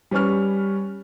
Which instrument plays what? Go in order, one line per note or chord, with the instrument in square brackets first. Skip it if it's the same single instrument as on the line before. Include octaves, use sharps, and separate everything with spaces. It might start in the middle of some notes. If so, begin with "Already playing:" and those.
[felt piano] G3 C#4 B4 C#5 C#6 F6